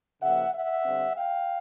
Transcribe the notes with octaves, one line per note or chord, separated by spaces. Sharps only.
C#3 F3 A#3 E5 F#5
E5 F#5
D3 G3 C4
F5 G5